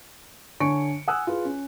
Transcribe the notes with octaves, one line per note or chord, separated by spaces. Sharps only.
D3 C#5 G#5 C#6 C#7 D7
F#5 G#5 D#6 E6 F#6
F4 G#4 B4
C#4